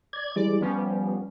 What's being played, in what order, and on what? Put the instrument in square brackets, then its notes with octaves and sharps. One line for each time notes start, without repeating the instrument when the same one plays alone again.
[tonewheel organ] D5 G#6
[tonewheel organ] E3 G3 G#3 [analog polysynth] D5
[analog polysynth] F3 G3 C#4 [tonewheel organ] B3